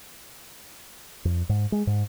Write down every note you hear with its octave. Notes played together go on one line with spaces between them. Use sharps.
F2
G#2
G#3
G#2